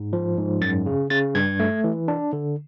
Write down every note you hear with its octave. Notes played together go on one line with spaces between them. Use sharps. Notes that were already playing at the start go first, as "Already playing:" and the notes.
Already playing: G#2
F3
G#2
F#2 A6
C#3
C#3 A6
G2 G#6
A3
E3
D4
D3